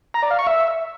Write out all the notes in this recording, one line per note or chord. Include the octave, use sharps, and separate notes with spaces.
A#5
D5
F5
C#6
E5